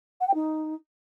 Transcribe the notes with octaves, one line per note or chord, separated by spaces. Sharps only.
F#5
G5
D#4